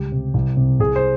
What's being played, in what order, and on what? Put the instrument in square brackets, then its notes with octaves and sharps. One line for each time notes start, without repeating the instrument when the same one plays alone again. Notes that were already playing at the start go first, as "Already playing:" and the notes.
Already playing: [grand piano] C#2 G3 G4
C3
C2
C3
C2 G#4
C5